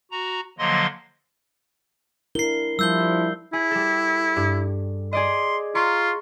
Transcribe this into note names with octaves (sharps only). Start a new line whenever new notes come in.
F#4 A#5
D3 F3 F#3 A#3 D#5 C6
D4 E4 A#4 C7 G7
F3 G3 E4 E6 G6 G7
E4 G#4
G3 A4
G2
G#4 D5 D#5 C6
F4 A#5 C6 C#6